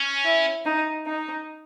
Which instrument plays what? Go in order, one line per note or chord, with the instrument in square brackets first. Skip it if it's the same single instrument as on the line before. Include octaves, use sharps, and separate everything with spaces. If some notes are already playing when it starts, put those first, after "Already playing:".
Already playing: [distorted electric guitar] C#4
[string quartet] E4
D#4
D#4